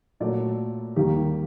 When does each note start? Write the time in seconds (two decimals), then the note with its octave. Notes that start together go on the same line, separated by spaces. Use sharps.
0.20 A#2 F#3 A3 D5
0.96 D#2 D#3 G3 A#3 G4